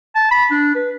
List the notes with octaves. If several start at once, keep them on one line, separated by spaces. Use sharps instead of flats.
A5
B5
D4
B4